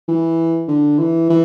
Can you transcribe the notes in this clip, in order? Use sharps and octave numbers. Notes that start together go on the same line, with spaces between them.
E3
D3
E3
E3